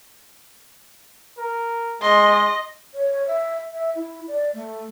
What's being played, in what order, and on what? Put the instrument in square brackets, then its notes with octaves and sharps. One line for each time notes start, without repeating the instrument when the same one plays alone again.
[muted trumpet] A#4
[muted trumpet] G#3 [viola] D#5 [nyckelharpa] C6
[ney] C#5
E5
E5
E4
D5
A3